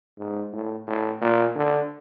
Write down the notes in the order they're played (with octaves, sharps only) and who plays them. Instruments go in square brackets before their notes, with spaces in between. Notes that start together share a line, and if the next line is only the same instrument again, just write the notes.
[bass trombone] G#2
A2
A2
A#2
D3